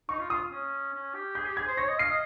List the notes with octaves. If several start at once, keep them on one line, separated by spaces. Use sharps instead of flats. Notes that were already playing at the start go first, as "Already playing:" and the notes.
D#4 C#6
F4
F4 D#6
C#4
C#4
G4
G#4 G6
G4
G#4 G#6
C5
C#5 A#6
D#5
F5 C7
D#5